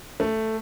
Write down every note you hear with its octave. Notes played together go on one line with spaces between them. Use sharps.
A3